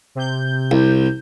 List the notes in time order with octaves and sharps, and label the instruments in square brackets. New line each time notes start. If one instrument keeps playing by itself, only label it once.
[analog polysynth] C3 G6
[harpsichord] C2